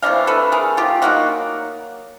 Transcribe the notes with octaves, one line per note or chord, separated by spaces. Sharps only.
C3 E3 A3 D4 D#5 F5
A4 B4
G#4 A#4
F4 G4
F#3 A#3 D#4 F#4